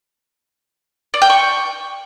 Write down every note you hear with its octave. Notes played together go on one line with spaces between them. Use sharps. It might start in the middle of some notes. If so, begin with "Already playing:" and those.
D5
G5
C#6